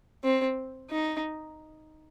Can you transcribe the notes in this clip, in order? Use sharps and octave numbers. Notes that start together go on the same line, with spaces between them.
C4
D#4